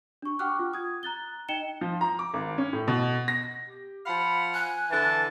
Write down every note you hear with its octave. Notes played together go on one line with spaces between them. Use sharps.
D4 C#6
F#5 G5 C#6 D6 F6 F#6
F4
D#6 G#6
A#5 F#6 A6 G7
D#4 D#5 G5 C#7 E7 G7
F3
A#5
D6
G#1
C#4
A2
B2
A#6
G4
F3 F5 F#5 B5
G#5 F#6
D3 E3 A5